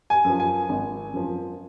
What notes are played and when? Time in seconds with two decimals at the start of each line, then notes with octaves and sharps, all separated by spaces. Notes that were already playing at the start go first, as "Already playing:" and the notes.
0.10 G#5
0.25 F#2 F3
0.40 G#5
0.69 G#1
1.14 F#2 F3